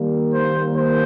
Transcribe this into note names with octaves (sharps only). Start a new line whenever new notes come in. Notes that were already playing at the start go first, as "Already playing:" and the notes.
Already playing: D#3 G3 A#3
C5
C5